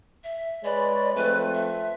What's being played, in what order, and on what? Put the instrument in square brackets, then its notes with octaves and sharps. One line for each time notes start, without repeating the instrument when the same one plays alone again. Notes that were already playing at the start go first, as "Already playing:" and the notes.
[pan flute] E5
[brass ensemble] G#3 B4 C#5 [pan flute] D5
[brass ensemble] F3 A3 C4 [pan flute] B4
[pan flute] E5